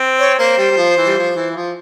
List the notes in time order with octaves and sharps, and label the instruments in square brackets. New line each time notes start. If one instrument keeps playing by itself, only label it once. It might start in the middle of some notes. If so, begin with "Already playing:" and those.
Already playing: [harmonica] C4
[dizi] C#5
[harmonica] A#3 [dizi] C5
[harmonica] G3
G3
F3
E3
G3
F3
E3
F3